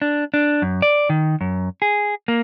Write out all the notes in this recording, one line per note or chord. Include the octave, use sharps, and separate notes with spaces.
D4
D4
F#2
D5
D#3
F#2
G#4
A#3